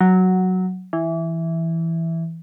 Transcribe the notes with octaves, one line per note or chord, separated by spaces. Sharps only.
F#3
E3